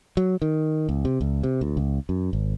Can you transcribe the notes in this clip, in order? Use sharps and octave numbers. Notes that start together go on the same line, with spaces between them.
F#3
D#3
C#2
C3
C#2
C3
D2
C#2
F#2
G#1